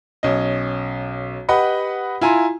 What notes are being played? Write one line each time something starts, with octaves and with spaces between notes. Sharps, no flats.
B1 C#4 D#5
G4 B4 D#5 F#5 B5
E4 F4 G#5 A#5 C6